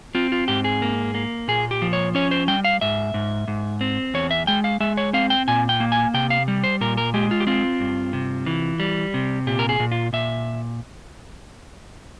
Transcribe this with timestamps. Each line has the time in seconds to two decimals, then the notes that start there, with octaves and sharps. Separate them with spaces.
0.15 C4 F4
0.32 F4
0.48 G#2 G4
0.64 G#4
0.82 A#3
1.15 A#3
1.48 A#2 G#4
1.71 G4
1.82 F3
1.93 C#5
2.15 C#4 C#5
2.31 C5
2.48 G3 G5
2.64 F5
2.81 G#2 E5
3.14 G#2
3.48 G#2
3.81 C4
4.14 E2 C#5
4.31 E5
4.47 G#3 G5
4.64 F5
4.80 G#3 E5
4.97 C#5
5.13 C4 F5
5.30 G5
5.48 A#2 G#5
5.69 G5
5.80 A#3
5.92 G#5
6.14 C3 G5
6.30 F5
6.48 G3
6.64 C5
6.81 A#2 A#4
6.97 A#4
7.14 G#3 G4
7.31 F4
7.40 G4
7.47 C4 F4
7.80 G2
8.13 C3
8.46 E3
8.80 G3
9.14 C3
9.47 A#2 G4
9.59 A#4
9.69 G#4
9.80 A#2
9.91 F4
10.13 A#2 E5